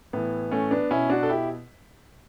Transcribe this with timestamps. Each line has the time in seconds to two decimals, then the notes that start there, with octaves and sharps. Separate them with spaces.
0.13 A2 E3 B3
0.51 A3 C#4
0.71 B3 D4
0.91 B2 C#4 E4
1.10 D4 F#4
1.23 A4
1.29 E4 G4